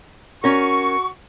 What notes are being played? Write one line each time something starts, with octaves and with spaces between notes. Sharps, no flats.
C#4 F#4 A#4 C#6